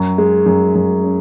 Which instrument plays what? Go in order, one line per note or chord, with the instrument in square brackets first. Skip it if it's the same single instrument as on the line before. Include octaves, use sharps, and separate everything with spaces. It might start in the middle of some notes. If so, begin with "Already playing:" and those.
Already playing: [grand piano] F#2
G#3
F#2
F#2
C#4